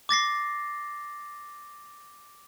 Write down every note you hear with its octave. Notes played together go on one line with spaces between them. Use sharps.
D6 A6 A#6 C7